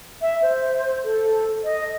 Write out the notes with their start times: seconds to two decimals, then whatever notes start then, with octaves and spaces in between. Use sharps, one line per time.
0.22 E5
0.42 C5
1.04 A4
1.64 D#5